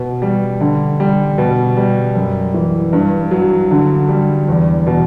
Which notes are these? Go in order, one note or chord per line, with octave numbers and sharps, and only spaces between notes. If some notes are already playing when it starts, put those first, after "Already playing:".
Already playing: B2
G3
D3
G3
B2
G3
F#2
E3
G2
F#3
D3
G3
E2
B2